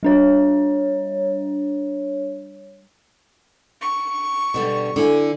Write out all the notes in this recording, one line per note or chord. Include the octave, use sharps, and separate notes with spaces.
G3 D4 C#5
C#6
B2 D3 G3
D3 E4 G#5